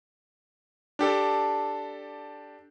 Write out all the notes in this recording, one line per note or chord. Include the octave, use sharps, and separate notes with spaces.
D4 G4 A4